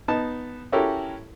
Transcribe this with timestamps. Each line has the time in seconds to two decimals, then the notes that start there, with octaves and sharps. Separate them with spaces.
0.08 B3 D#4 A5
0.72 C#4 E4 F#4 G4 A4 A#4